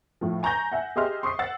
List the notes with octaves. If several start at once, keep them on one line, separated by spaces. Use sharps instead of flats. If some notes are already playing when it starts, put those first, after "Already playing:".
A2 F3
G#5 A#5 C#6 G6 A#6
E5 F#5 G#5
G4 G#4 D#5 E5 C6 F6
C6 C#6 D#6 C7
F#5 E6 A6